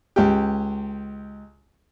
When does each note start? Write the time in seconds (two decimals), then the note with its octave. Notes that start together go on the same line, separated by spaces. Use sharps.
0.16 C#2 G4